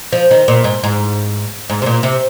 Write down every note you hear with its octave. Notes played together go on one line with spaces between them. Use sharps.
F3
D#3
A#2
G#2
G#2
G#2
C3
A#2
C3